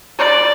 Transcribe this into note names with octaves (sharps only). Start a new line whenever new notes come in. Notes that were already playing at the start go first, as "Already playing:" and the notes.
D5